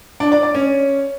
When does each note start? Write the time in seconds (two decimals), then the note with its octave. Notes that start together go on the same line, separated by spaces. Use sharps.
0.20 D4
0.32 D5
0.43 D5
0.55 C#4